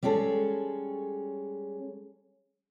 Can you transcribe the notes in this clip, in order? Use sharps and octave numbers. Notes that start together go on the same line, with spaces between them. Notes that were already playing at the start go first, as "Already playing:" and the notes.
G3 G#3 C#4 G#4 A4